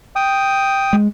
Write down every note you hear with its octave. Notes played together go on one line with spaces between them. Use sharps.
G5 D#6
G#3